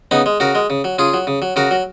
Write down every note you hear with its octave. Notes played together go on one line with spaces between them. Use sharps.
C#3 B3 D#4
G#3
C#3 F#4 A#4
G#3
C#3
F#3
C#3 F4 G#4
F#3
C#3
F#3
C#3 F#4 A#4
F#3